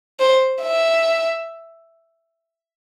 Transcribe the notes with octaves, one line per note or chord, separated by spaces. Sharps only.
C5
E5